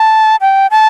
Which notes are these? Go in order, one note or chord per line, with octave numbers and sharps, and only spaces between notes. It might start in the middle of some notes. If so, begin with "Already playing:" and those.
Already playing: A5
G5
A5